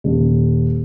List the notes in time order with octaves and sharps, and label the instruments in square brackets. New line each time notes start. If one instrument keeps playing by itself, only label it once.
[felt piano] D#1